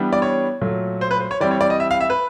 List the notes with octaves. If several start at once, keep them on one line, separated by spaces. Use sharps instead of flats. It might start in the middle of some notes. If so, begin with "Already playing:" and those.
Already playing: E3 G3 B3 D4
D5
C#5
A#2 F#3 A3
C5
B4
C5
C#5
E3 G3 C4 D5
C#5
D5
D#5
E5
F5
E5
B4